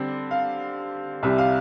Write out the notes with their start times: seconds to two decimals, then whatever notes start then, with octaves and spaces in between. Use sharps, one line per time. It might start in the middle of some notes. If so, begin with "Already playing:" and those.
Already playing: D3 G3 C4
0.31 F5
1.23 C2 C3 G3 E5
1.38 F5